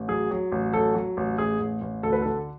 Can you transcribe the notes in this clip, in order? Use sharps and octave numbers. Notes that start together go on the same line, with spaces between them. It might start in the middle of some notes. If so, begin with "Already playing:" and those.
Already playing: A1
F#3 G#4
F#3
A1
F#3 A4
F#3
A1
A1 G#4
A1
A1
D2 A4
B4
D3 A4